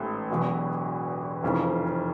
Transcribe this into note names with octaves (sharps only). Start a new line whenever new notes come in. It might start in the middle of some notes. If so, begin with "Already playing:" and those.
Already playing: A1 G#2 A3
E1 E2 B2 F#3
F1 F2 C#3 E3